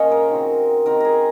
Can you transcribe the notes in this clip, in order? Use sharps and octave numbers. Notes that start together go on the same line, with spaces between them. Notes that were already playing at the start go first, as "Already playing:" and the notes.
Already playing: A#2 F3 G#3 C#4 C#5 D#5 F5
A#4
D#3 F#3 C4
D#3 F#3 C4 A#4
G#4 A#4